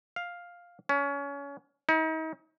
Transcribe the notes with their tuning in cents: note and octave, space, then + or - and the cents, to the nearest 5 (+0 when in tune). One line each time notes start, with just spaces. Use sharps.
F5 +5
C#4 +25
D#4 +40